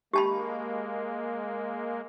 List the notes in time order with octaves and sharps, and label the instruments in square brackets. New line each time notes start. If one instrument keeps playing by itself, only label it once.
[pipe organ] G#3 A#3 [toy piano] G4 A5 B5